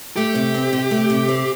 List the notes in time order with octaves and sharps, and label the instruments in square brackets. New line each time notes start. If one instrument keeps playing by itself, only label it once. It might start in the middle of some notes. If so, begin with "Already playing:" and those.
[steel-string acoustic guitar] A3 [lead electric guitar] G4
[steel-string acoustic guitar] C3
C4
C3
A3
C3
C4